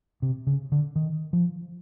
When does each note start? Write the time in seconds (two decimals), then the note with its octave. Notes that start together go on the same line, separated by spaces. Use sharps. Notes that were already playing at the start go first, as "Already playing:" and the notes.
0.22 C3
0.47 C#3
0.72 D3
0.96 D#3
1.33 F3